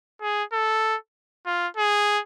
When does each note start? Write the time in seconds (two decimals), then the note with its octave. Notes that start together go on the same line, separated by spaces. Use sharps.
0.22 G#4
0.53 A4
1.46 F4
1.77 G#4